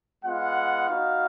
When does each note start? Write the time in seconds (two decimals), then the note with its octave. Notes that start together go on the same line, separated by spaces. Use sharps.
0.25 G#3 B3 F4 F#5
0.89 B3 D#4 F#4 F5